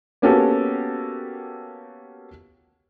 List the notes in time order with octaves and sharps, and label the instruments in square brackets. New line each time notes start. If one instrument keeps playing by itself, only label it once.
[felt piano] A#3 B3 C#4 F#4 G4 A4